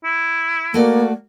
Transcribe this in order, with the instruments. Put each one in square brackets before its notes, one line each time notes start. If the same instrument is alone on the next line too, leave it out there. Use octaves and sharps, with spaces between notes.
[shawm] E4
[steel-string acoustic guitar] A3 F#4 D5 [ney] A#3